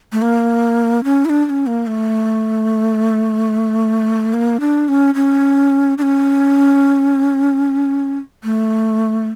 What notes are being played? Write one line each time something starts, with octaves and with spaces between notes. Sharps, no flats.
A3
A#3
C#4
E4
D4
D4
C#4
A#3
A3
A#3
D4
C#4
C#4
D4
C#4
A3